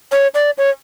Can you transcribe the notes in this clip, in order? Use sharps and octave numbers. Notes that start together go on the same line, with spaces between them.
C#5
D5
C#5